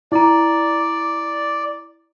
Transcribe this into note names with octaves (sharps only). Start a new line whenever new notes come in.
E4 D5 A#5